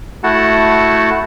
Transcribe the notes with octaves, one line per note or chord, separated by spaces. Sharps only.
A3 E4 F#4 F#5 A5